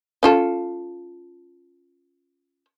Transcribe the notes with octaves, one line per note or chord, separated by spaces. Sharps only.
C#4 F4 A4